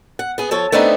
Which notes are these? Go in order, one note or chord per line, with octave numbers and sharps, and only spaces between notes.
F#5
B3 G#4
F3 A4 C#5
A3 B3 C4 D4 D#4